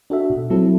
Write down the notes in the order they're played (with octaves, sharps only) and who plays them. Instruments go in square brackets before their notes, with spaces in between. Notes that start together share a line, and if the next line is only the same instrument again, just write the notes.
[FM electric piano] D4 F#4 A4 E5
B2
F#3 C4 E4 A4